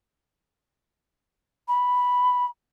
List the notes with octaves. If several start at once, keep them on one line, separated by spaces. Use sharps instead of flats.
B5